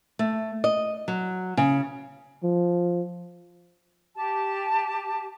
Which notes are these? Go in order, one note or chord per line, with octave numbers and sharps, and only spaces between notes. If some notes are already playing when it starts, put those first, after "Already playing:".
A3
D#5
F#3
C#3
F3
G4 A5